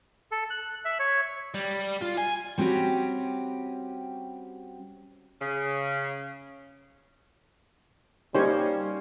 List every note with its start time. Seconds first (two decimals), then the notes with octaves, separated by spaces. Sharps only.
0.32 A4
0.50 F#6
0.85 E5
0.99 C#5
1.54 G3
2.01 F4
2.17 G#5
2.58 G3 C4 C#4 F#4 G4
5.40 C#3
8.35 G3 A#3 C#4 D#4 G4 C5 C#5